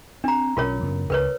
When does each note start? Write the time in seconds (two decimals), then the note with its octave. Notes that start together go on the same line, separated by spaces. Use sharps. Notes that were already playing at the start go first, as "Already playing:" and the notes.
0.24 C4 D4 A#5
0.57 B1 G3 C#4 F4 A#4 C#5
0.83 F#2 C#3 B3
1.10 C#2 C#3 A#4 B4 C#5